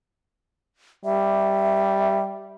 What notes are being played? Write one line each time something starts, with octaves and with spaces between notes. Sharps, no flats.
G3 E5